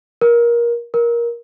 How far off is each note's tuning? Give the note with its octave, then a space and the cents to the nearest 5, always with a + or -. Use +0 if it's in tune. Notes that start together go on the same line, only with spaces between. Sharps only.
A#4 +20
A#4 +15